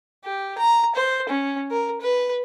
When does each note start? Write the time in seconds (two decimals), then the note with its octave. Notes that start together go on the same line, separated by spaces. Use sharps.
0.25 G4
0.58 A#5
0.95 C5
1.29 C#4
1.71 A#4
2.01 B4